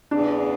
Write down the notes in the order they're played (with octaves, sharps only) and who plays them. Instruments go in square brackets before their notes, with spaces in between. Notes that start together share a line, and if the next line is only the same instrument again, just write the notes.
[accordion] E2 C#3 E3 [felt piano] D4